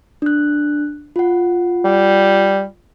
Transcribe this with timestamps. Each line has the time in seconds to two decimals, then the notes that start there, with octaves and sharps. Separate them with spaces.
0.22 D4 F#6
1.16 F4 F#5
1.85 G3